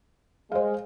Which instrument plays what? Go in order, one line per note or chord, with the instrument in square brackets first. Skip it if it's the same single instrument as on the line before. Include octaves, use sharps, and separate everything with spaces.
[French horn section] G#3 [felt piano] C5 F5